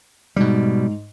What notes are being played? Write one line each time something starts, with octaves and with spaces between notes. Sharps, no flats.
G#2 B2 G3